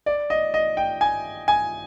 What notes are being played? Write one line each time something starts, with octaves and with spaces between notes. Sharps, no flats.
D5
D#5
D#5
G5
G#5
G#5